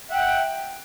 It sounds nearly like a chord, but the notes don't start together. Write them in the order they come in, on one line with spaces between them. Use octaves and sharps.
F#5 E5 G5